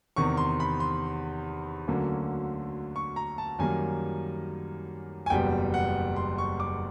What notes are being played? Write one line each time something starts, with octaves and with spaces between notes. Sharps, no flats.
E2 C3 D#3 C#6
C6
B5
C6
D2 D3 F#3 A#3 C#4
C#6
A#5
A5
F#2 D#3 G3 A#3 G#5
G#5
F#1 E2 B2 G3 B3 G5
F#5
C6
C#6
D6